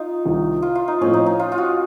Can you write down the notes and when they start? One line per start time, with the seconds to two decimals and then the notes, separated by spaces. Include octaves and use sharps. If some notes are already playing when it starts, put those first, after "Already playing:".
Already playing: D#4 F4
0.25 C2 C3 D#3
0.62 F4
0.75 F4
0.88 D#4
1.01 A2 F3 C4 C#4
1.13 D#4
1.26 D#4
1.39 F4
1.52 F4
1.58 F#4